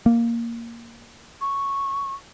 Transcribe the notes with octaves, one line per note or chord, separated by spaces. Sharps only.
A#3
C#6